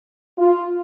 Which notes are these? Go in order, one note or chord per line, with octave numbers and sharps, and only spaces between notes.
F4